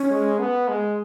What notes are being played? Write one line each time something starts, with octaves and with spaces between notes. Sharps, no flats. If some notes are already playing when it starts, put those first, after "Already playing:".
Already playing: C#4
G#3
B3
G#3